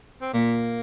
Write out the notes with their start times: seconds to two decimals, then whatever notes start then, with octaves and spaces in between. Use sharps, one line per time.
0.22 C4
0.33 A#2 A#3